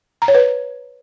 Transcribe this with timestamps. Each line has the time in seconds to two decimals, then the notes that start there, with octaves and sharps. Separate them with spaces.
0.22 A#5
0.28 C#5
0.34 B4